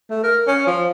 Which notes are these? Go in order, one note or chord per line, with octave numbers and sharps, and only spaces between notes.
A3
A#4
C#4
F3